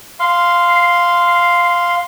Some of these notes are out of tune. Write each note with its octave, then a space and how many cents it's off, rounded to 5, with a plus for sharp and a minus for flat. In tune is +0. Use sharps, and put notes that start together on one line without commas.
F5 +0 C6 -10